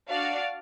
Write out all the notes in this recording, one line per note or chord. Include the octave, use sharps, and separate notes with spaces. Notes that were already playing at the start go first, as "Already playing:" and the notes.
D4 F#4 D5 F5